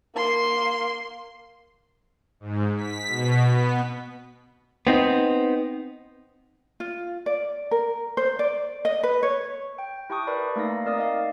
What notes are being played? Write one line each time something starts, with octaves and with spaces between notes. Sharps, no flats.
A#3 C6
G#2
B6
B2
B3
B3 C4 D#4
F4
D5
A#4
C5
D5
D#5
B4
C#5
G5
E4 G4 G5 A5 C#6 D#6
A#4 B4 D5 B5
A3 A#3 D#4 F5 A#6
C4 D#4 A#4 D5 D#6
D#5 F5